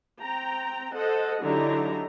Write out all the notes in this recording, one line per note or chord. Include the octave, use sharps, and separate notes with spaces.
C4 G5 A#5
A4 C5 D#5 F#5
D3 F#3 D#4 E4 G4 A#5